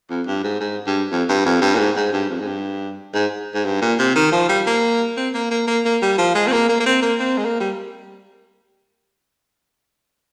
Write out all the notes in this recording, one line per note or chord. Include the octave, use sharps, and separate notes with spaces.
F2
G2
G#2
G#2
G2
F2
G2
F2
G2
A#2
G#2
G#2
G2
F2
G#2
G2
G#2
G#2
G2
A#2
C3
D#3
F3
G3
A#3
C4
A#3
A#3
A#3
A#3
G3
F3
G#3
C4
A#3
A#3
A#3
C4
A#3
C4
G#3
A#3
G3